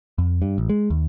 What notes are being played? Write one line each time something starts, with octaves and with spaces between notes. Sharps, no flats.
F2
G2
A1
G#3
D#2